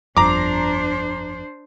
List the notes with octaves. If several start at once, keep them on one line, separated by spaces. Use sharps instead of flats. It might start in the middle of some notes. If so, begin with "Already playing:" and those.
G1 F2 D4 C5 A#5 D6